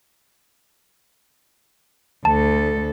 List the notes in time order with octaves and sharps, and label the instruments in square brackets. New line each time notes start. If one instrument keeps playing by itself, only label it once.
[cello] D2 A4 [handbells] A5